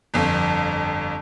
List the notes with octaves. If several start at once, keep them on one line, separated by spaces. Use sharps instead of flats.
G1 F2